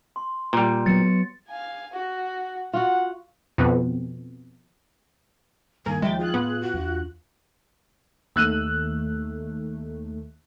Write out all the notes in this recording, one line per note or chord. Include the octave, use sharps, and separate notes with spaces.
C6
A#2 G3
F#3 B3 A6 C#7
F5 G#5
F#4
F4 F#4 F#5
F2 B2
G2 D#3 A#3 G#5
D#2 F3 G#3 E5 G5 A6
F4 G#4 F#6
A2 B3
F#4
E2 D4
D#2 A3 E6 F#6 D#7